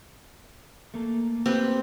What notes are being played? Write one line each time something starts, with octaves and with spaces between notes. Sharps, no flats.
A3 A#3 A4
C4 G4 B4